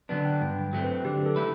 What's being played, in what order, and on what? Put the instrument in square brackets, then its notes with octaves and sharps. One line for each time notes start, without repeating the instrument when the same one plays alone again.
[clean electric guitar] D3 F#3 B3 D4 [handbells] B4
[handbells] G5
[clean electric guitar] G2 [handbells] G5
[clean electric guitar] F#3 A3 C4
[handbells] B4
[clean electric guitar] D3 [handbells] G4
[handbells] A4
[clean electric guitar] A3 E4 B4